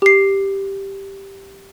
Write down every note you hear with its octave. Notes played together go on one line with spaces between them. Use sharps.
G4 C7